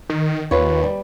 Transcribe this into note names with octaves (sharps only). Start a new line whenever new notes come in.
D#3
D#2 F4 B4 C#5
G3